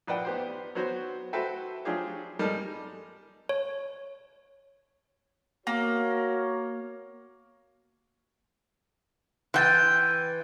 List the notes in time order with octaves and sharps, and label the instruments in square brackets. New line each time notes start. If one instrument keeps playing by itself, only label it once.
[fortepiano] A#1 B4 D5 F#5 G5
B3 G4 C5
F#3 B3 F#4 C5
F#4 A4 B4 C5 E5 G5
F3 F#3 D4 F4 G4 G#4
G3 G#3 D#4 A4 A#4 D#5
[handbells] C#5
[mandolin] A#3 [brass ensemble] F#4 A#4 C#5
[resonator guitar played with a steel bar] E3 G5 [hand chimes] C6 G6 A6